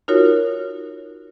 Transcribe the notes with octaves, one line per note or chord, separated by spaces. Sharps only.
D#4 F4 F#4 A#4 C#5